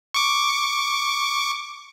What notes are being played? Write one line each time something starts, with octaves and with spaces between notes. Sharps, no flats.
C#6 D6